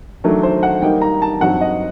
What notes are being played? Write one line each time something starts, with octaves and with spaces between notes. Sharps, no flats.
D#3 F#3 A3 D4 A#4
C5
F#5
D#3 G3 A#3 D#4 G5
A#5
A5
G2 F#3 C4 D#4 F#5
D#5